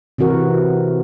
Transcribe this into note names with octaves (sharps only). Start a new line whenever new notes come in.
C3 E3 F#4 A#4